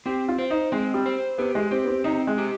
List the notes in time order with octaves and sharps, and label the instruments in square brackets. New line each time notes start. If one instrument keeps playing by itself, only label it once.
[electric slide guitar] C4 [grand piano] G4
[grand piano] F4
[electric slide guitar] C5
[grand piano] D#4
[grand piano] G#3 [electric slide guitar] C4
[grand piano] G3
[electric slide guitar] C5
[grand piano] B3 [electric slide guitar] G4
[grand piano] G#3
[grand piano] C4 [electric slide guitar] G4
[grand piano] B3
C4
[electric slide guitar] C4 [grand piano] D#4
[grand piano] G#3
[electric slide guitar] G4